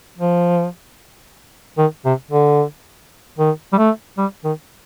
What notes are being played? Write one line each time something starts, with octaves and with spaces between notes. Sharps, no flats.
F3
D#3
C3
D3
D#3
G3
A3
G3
D#3